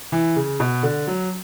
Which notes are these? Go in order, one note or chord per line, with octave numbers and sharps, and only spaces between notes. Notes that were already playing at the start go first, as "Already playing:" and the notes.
E3
C#3
B2
D3
F#3